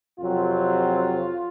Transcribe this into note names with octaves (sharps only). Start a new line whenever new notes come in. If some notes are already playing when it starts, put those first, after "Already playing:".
F2 C3 F#3 C4 F4